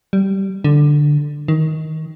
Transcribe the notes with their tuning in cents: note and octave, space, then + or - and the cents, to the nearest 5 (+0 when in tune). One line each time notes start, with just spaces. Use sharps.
G3 -15
D3 +5
D#3 +15